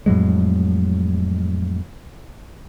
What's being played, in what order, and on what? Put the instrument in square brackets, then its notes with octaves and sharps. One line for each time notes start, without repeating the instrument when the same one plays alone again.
[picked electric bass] F2 A2 F#3 G#3